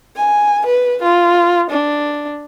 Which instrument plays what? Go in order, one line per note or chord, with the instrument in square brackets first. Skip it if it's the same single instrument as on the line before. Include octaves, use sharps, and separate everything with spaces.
[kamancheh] G#5
B4
F4
D4